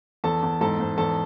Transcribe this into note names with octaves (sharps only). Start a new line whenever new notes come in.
E2 A4 A5
E2
G#2 A4 A5
G#2
E2 A4 A5